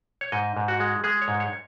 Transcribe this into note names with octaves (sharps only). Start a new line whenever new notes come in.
C#5
G#2 D#5
G#2
F#4
G#3
G#3 G#4
C#5
G#2
C#5